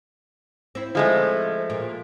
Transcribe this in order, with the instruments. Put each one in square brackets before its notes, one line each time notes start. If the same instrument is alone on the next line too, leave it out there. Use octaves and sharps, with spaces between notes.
[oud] C4 E4
[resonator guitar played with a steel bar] F3 G#3 A3
[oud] A#2